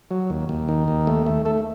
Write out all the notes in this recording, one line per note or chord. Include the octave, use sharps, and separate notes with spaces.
F#3
D#2
D#2
D#3
D#2
A3
A3
A3 A4